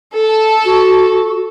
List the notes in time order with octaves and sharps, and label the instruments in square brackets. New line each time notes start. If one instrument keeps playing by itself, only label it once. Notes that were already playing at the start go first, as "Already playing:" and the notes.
[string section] A4
[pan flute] F#4